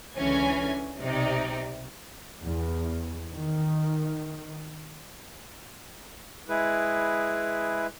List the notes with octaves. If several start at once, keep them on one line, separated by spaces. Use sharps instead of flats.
C#2 D3 E3 C#4 G#5
B1 C3 D#4 D5
E2
D#3
G#3 E4 G#4 B4